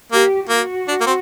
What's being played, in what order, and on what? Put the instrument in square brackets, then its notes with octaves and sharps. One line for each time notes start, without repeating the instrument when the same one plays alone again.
[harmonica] A#3 [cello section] G4
[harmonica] A#3 [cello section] F#4
[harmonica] D4
A#3
C4